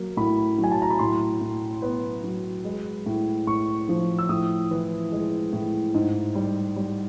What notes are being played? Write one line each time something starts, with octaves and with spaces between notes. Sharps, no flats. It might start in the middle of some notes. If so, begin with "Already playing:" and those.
Already playing: F#3 A#3
A2 B5
F#3
G#5
A5
A#5
B5
A2 C6
A2
B3
F#3
G#3
A2
A2 C#6
F3
E6
A2 D#6
E3
G#3
A2
G#2
G3
G3